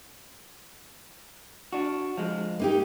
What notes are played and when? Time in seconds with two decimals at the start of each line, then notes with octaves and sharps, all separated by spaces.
1.73 D4 F#4
2.17 F3 G#3
2.59 A#3 D#4 G4